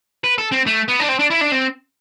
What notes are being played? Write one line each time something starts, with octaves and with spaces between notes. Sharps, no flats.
B4
A4
C4
A3
B3
D4
C4
D4
E4
D4
C4